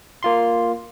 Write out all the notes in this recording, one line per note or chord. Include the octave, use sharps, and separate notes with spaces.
A#3 F4 C6